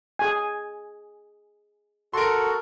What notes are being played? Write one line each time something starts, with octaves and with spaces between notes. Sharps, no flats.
G#4 G#5
F#4 A4 A#4 C6